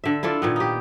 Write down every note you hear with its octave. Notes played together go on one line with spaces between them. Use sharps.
D3 E5
E4 F4 A4 D5
A#2 D#3 B3
D#4 G4